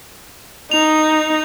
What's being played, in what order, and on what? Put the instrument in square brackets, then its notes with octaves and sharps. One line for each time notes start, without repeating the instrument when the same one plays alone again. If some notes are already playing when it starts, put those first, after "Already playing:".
[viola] D#4 [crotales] F7